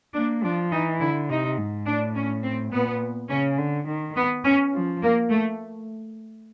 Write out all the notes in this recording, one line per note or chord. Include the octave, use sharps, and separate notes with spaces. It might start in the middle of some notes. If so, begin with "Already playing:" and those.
A#3 D4
F3 D4
E3 D#4
D3 E4
C3 D#4
G#2
A2 D4
C#4
C4
A#2 B3
C#3 C#4
D3
D#3
B3
C#4
F3
A#3
A3